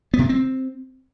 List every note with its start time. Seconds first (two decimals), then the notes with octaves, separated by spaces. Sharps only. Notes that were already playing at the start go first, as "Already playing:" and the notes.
0.14 B3
0.19 C3
0.24 G#3
0.29 C4